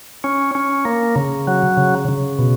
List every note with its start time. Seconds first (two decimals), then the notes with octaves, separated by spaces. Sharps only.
0.24 C#4
0.55 C#4
0.85 A#3
1.16 C#3
1.47 F#3
1.77 C#3
2.08 C#3
2.39 B2